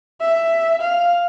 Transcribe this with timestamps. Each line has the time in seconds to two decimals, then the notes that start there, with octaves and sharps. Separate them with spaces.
0.21 E5
0.82 F5